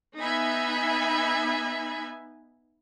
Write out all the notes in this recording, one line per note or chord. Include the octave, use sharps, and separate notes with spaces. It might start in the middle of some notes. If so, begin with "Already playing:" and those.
B3 D#4 E5 G#5 B5